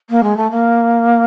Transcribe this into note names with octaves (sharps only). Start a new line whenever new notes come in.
A#3
G#3
A3
A#3